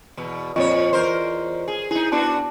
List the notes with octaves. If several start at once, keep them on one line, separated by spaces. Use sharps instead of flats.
E2 B2
F2 A#2 F4 C#5 D#5 C#6
E2 A#4 C5
G#4
D#4 E4 G#4
B3 D4 F#4 A5